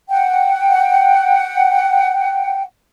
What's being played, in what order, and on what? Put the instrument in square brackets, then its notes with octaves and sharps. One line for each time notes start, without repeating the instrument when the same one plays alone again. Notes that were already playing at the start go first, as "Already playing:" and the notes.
[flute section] F#5 G5